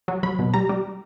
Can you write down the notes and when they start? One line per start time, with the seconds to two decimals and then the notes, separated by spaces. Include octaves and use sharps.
0.08 F#3
0.23 F#3 B5
0.39 B2
0.54 G3 A#5
0.69 G3